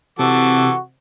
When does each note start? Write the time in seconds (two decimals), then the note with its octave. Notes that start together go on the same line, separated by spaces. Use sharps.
0.19 C3 E3 F#4 A4 D6